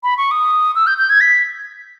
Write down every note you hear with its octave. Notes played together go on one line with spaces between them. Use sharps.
B5
C#6
D#6
E6
G6
G6
G#6
B6